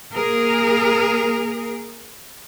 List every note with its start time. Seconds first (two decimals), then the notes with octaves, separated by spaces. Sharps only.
0.12 A#3 G#4 A#4